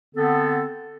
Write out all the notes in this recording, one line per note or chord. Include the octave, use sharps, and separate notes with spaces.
D3 B3 C4 A4